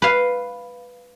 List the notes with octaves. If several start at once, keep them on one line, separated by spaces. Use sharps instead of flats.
B4 F5